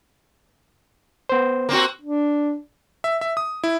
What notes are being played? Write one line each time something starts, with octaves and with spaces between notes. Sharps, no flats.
B3 C5
A#3 C4 F#4
D4
E5
E5
D#6
E4